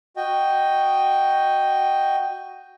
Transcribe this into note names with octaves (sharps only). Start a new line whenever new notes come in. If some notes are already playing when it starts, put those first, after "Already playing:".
F#4 D#5 G5